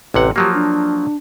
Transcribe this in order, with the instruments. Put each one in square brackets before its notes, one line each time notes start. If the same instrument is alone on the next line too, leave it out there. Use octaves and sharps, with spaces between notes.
[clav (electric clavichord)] A1 C3 F#5 [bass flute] B4
[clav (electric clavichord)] F3 F#3 A#3 [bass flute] G4
[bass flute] D4